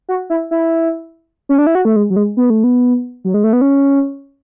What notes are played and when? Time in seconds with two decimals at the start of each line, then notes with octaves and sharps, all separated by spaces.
0.09 F#4
0.30 E4
0.51 E4
1.49 C#4
1.58 D4
1.67 E4
1.75 F#4
1.85 A3
1.96 G#3
2.10 F#3
2.16 G#3
2.37 B3
2.50 A3
2.64 B3
3.25 F#3
3.34 G#3
3.44 A3
3.53 B3
3.61 C#4